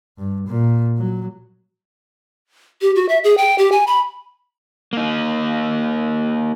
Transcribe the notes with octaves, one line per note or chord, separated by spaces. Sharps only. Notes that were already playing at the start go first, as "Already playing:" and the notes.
G2
A#2
F#3
G4
F#4
E5
G#4
G5
G4
G#5
B5
A#3 D#4